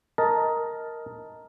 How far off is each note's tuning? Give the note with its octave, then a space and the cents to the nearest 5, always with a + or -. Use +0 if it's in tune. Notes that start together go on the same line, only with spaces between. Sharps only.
A#4 +0 D#5 +15 A5 +0